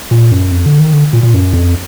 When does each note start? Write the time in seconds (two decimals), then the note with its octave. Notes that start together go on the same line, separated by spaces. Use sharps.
0.11 A#2
0.32 F#2
0.51 F2
0.66 D3
0.79 D#3
0.93 D3
1.13 A#2
1.23 A#2
1.34 F#2
1.53 F2